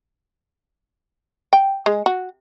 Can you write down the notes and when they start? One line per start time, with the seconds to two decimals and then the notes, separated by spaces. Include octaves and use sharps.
1.53 G5
1.86 G#3
2.06 F#4